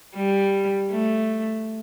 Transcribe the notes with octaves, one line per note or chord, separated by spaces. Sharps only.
G3
A3